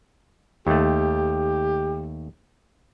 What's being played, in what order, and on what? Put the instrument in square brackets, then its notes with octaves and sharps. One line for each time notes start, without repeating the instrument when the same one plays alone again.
[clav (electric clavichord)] D#2 A3 [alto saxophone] G4